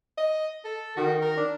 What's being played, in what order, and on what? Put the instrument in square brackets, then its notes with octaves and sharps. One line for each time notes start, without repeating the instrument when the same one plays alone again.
[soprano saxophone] D#5
A4
[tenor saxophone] D#3 [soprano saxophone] F#4
[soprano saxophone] A#4
[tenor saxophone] D4